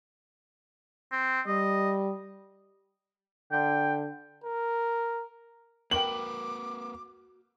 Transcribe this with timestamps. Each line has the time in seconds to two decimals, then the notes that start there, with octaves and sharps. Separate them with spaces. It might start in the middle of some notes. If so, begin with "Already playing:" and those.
1.12 C4
1.47 G3 D#5
3.52 D3 G5
4.44 A#4
5.91 A#3 F#4 A#4 B4 G5 D6 F#7